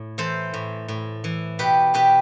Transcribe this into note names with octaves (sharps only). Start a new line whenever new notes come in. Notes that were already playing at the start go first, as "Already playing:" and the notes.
Already playing: A2
E3 A4 C5
A2
A2
E3
B2 G4 B4
B2 G4 B4